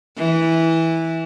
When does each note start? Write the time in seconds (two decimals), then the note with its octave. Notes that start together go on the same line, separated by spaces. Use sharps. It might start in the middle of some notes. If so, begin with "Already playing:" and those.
0.17 E3